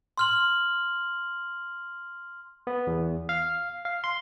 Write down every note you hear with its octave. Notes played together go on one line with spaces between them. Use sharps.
C6 F6 F#7
B3
E2
F5
F5
C6